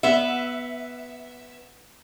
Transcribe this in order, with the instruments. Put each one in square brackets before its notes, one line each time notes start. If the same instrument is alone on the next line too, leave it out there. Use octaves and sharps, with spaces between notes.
[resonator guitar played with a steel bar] B3 E5